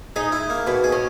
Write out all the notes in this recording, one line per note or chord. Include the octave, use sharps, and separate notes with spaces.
D#4 G#4
E4
A#3
B2 B3
G#4
C#4